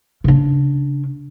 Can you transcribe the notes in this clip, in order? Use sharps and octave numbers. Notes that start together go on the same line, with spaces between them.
C#3 D4